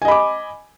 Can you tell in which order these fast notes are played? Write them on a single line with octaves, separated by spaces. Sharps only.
G#5 D#5 B5 D6